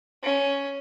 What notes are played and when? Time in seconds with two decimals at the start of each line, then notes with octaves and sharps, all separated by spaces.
0.23 C#4